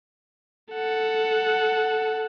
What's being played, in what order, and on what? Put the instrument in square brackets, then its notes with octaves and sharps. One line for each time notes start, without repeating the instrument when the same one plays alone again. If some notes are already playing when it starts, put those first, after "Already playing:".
[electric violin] A4 F#5